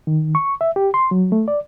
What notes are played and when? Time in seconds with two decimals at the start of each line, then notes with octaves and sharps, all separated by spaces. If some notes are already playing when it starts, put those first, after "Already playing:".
0.07 D#3
0.35 C#6
0.61 E5
0.76 G4
0.94 C6
1.11 F#3
1.32 A3
1.48 D5